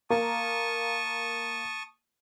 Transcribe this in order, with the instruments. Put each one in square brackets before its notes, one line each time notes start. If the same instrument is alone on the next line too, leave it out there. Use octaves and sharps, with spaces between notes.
[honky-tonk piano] A#3 [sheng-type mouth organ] A5 C#6 D#6